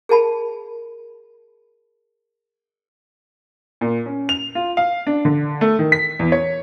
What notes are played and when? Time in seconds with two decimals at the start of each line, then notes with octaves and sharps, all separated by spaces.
0.09 G#4 A#4 A5 B5
3.81 A#2
4.06 C#4
4.29 F7
4.55 F4
4.77 F5
5.07 D4
5.25 D3
5.61 A3
5.79 D#3
5.92 B6
6.19 E2
6.32 C#5